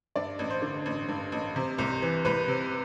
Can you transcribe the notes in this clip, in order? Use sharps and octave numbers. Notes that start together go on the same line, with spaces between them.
G2 D5
A1
C5
D3
A1
G2
A1
C3
C2
E3
C2 B4
C3